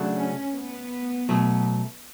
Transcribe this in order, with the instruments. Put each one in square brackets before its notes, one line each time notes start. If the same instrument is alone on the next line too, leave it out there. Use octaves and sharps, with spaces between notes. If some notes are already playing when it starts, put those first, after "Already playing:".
Already playing: [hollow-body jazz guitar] C#3 F#3 A3 D4 F#4
[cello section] C#4
B3
[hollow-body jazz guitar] B2 F#3 A3